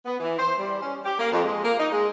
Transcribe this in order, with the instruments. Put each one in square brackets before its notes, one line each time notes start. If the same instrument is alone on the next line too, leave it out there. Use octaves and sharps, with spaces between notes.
[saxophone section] B3
E3
C5
G3
C#4
G4
A#3
F2
G#3
A#3
D#4
G#3